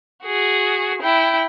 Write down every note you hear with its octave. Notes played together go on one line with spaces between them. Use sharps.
F#4 G#4
E4 G5